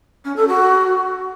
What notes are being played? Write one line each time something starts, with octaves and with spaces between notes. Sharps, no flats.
C#4
A4
F#4